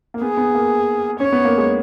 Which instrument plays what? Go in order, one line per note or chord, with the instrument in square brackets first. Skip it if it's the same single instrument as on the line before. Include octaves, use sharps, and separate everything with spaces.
[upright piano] A#3
[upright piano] B3 [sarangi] G#4
[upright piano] B3
A#3
[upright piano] C#4 [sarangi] C#5
[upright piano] B3
A#3
G#3